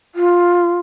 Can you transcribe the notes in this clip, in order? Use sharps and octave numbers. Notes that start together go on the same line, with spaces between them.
F4